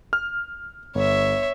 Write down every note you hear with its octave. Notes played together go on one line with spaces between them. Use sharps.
F6
G1 C#5 E5